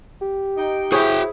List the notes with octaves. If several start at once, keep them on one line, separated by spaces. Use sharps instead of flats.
G4
D#4 G5
E4 F#4 G#4 C5 C#5 G5